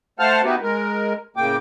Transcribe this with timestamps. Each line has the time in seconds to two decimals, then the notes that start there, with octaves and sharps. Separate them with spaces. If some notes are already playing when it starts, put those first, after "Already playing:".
0.19 A3 C5 F5 F#5 A5 F6
0.44 B3 D#4 E4 F#4 G4 B4
0.62 G#3 A#4
1.36 A2 C#3 A#3 G5 D6